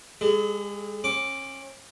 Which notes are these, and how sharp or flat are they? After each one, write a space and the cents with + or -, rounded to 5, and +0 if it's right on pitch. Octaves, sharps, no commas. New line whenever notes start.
G#3 -40 G#4 +40
C#4 -35 D6 +0